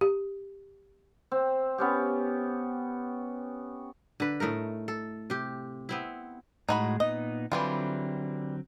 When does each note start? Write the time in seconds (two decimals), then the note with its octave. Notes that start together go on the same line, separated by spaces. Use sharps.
0.01 G4
1.31 C4
1.78 B3 C#4 G4
4.20 D3 B4
4.40 A2 A3 D#4 A#4
4.88 A4
5.30 C3 G4
5.89 B3 C4 E4
6.69 A2 G#3 D#4 F#4 B5
7.00 A#2 B3 D#4 D#5
7.52 D3 E3 F#3 G3 C4 F4